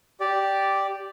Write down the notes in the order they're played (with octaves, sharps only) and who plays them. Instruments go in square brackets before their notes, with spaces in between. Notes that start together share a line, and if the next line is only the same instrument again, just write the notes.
[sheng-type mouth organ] G4 D5